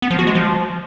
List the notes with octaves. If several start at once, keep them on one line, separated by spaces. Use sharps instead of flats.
B3
F3
F#4
G#3
F3